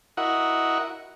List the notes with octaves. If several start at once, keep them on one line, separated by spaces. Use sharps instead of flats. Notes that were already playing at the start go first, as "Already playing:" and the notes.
E4 F#4 A#4 D#5 F#5